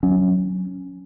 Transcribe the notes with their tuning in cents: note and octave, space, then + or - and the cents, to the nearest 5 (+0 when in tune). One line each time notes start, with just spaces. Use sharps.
F#3 +0 C#4 +0